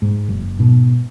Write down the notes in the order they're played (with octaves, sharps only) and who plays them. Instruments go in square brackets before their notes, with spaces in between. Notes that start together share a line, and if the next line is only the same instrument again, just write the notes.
[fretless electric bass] G#2
F#1
G#2 B2